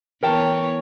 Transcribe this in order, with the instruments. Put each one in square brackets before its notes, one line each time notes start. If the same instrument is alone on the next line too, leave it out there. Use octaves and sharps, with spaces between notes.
[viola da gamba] E3 B3 C#5 [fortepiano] A#4 G5 A5